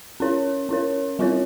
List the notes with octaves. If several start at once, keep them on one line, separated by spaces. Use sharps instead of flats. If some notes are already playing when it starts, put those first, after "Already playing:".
C#4 E4 A#4 C#5
C#4 E4 A#4 C#5
G3 C4 F4 A#4 C#5